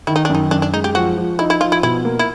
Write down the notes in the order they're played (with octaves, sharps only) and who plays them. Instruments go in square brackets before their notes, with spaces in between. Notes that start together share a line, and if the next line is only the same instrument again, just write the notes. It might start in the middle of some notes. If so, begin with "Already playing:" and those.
[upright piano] D#3 [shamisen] E4
[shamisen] D#4
D4
[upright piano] F#2
[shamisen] D#4
[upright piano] F#2 [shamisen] D4
[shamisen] D4
[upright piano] G#3 [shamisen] D#4
[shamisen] G4
[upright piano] F3 [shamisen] F#4
[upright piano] F3
[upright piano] D#4 [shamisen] E4
[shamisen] E4
[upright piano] F3 [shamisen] F4
[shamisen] E4
[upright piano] B2 [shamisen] E4
[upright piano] A#3
[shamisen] E4